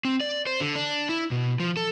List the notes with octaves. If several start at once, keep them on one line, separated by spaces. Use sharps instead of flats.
C4
D5
C5
D3
D4
E4
B2
F3
A4